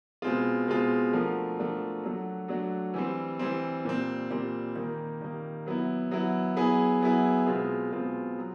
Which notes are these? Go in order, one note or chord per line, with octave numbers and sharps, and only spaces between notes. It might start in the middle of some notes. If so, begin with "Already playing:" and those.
B2 G#3 C4 F4
B2 G#3 C4 F4
F3 A3 D4 F#4 A#4
F3 A3 D4 F#4 A#4
F#3 A3 D4 F#4
F#3 A3 D4 F#4
E3 G3 C4
E3 G3 C4
A#2 G3 C4
A#2 G3 C4
D#3 G3 A#3
D#3 G3 A#3
F#3 B3 E4
F#3 B3 E4
F#3 B3 E4 G#4
F#3 B3 E4 G#4
B2 G#3 C4 F4
B2 G#3 C4 F4
F#3